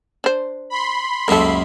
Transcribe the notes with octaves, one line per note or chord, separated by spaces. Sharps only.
D4 C5
B5 C6
C#2 F#2 A#3 A4 A#4